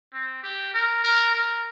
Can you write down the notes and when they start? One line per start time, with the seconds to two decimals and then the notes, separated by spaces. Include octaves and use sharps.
0.13 C4
0.43 G4
0.74 A#4
1.04 A#4
1.34 A#4